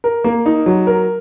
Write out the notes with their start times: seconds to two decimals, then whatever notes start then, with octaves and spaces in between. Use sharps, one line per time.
0.04 A#4
0.24 A#3
0.46 D#4
0.66 F#3
0.87 A#4